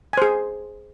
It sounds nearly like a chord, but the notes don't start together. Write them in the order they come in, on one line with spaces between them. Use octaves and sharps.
G#5 C5 G#4